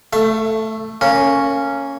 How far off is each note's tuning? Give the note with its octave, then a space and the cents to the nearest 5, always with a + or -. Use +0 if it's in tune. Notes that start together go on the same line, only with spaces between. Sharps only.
A3 +0 E5 +35
A#3 -20 C#4 +0